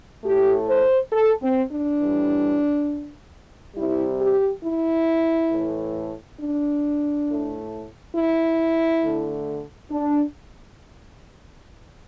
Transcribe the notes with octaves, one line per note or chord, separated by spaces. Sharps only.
A2 A3 G4
C5
A4
C4
D4
A2 E3 G3
C3 G3 E4
G4
E4
A2 E3 A3
D4
A2 A3
E4
D3 A3
D4